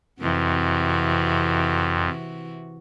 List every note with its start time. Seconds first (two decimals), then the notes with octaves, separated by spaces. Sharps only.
0.20 F2 C3 E3 F#4